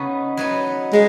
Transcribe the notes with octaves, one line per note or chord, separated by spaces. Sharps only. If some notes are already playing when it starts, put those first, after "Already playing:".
Already playing: C#3 B3 D#4
F#3 B3 D#4
G#3 D#4